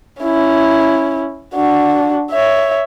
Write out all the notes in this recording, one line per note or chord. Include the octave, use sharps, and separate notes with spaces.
C#4 E4
D4 F#4
C#5 E5